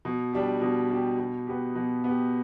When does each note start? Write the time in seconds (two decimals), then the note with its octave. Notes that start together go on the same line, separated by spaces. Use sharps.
0.05 B2
0.33 G3 D4 G4
0.62 B2
0.90 G3 D4 G4
1.19 B2
1.47 B3 G4
1.75 B2
2.04 B3 G4